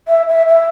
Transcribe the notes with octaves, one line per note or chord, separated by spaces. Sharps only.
E5
E5
E5